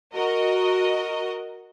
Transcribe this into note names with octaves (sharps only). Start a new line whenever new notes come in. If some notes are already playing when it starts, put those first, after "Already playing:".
F#4 A#4 D#5